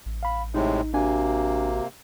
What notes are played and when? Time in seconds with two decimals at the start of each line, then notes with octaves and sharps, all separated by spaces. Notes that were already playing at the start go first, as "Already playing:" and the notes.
0.06 A1
0.23 F5 B5
0.54 A2 C3 G#3 D#4
0.94 C3 A#3 D4 F#4 G#5